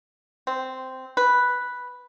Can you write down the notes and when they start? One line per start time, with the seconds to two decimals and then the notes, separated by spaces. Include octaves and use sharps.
0.47 C4
1.17 B4